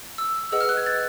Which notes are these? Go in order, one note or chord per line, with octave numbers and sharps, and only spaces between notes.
E6
G#4 B4 D#5 F#5 E6
F6
F#6
G#6
A6